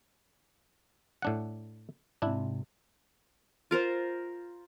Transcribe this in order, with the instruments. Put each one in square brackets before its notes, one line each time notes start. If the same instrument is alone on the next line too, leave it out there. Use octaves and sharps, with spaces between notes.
[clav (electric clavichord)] A2 D4 F#5
[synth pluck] G#2 C3 [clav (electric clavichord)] D4 E4
[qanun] F4 A#4 C5